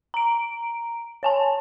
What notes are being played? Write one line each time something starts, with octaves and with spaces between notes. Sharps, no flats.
A#5 D7
C#5 G#5 A5